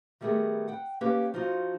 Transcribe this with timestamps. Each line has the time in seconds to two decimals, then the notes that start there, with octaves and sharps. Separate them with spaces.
0.21 D#3 G3 A3 B3 G#4 A#4
0.68 F#5 G5
1.01 A#3 C#4 G4 B4 C#5
1.34 F3 D#4 F4 F#4